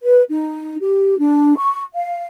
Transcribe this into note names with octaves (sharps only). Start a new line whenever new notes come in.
B4
D#4
G4
D4
C#6
F5